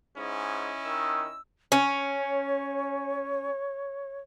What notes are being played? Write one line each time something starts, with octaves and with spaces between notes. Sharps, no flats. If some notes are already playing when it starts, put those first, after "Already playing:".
G#2 C#4 E4 D#5
D#3 E6
C#4 C#5